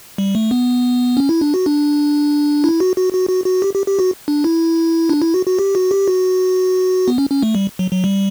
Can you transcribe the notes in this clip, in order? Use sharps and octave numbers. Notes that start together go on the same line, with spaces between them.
G3
A3
B3
C#4
E4
D4
F#4
D4
E4
F#4
F#4
F#4
F#4
F#4
G4
G4
G4
F#4
D4
E4
D4
E4
F#4
F#4
G4
F#4
G4
F#4
B3
C#4
C#4
A3
G3
F#3
F#3
G3